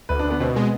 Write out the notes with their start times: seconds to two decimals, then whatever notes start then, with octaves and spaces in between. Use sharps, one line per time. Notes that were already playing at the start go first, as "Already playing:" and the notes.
0.09 D2 B4
0.19 D4
0.25 D2
0.30 B3
0.40 B2 C4
0.56 G#3 B3